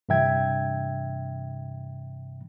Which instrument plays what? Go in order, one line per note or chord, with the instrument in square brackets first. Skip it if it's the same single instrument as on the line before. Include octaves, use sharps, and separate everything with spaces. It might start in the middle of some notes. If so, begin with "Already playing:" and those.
[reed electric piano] G2 C3 E3 E5 G5 G#6